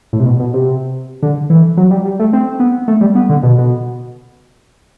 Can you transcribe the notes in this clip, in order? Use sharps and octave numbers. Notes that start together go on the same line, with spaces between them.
A2
C3
B2
B2
C3
D3
E3
F#3
G3
G3
A3
C4
B3
A3
G3
B3
D3
B2
B2